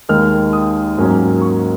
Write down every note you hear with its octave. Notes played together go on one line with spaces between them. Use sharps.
D#2 D#3 G#3 F6
D#6
G#2 F#3 A#3 C#4
C#6